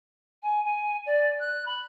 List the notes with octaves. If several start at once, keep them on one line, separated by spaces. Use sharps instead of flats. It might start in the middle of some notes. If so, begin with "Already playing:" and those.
G#5
G#5
D5
F#6
B5